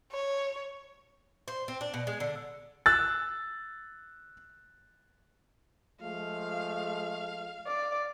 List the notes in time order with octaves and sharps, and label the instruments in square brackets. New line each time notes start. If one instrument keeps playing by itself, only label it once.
[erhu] C#5
[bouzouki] C5
C4
D4
B2
G#3
D3
[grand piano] E6 F#6 A6
[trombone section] F3 G#3 A3 [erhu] F5
[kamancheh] D5